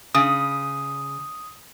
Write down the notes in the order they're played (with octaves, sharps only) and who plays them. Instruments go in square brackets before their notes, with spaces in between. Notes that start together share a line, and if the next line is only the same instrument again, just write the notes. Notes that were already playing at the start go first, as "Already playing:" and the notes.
[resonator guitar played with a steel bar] C#3 [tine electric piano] D#6